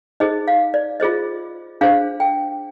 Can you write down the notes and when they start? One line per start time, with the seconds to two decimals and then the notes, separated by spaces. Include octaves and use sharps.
0.20 D#4 G#4 C5 D#5
0.48 F5
0.74 D5
1.00 F4 G#4 C5 D#5
1.81 D4 G#4 C5 F5
2.20 G5